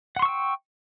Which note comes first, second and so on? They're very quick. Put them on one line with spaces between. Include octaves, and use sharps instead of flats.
F#5 C6 C#6 E6 G5